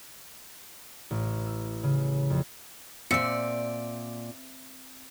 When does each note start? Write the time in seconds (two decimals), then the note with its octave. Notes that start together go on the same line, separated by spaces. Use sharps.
1.11 A1
1.47 E6
1.83 C#3
2.30 F2
3.11 A#2 C4 D5 E5 C#7